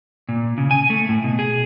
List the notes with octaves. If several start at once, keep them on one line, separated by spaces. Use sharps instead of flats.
A#2
C#3
G#5
A3
A2
B2
G#4